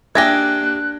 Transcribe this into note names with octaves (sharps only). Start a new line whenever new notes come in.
A#3 D4 G4 G#4 E5 F#6 G#6 A#6